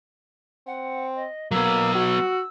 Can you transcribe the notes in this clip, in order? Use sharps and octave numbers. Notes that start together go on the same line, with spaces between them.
C4 F#5
D#5
F#3 A#3 B3 E6
F#4